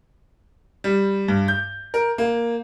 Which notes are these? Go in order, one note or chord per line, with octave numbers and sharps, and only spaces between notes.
G3
G2
G6
A#4
A#3